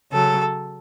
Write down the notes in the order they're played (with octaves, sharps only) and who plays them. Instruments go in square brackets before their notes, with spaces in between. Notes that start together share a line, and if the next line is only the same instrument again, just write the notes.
[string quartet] C#3 F#3 A4